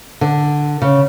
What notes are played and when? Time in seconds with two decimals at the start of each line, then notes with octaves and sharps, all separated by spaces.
0.21 D3
0.82 C#3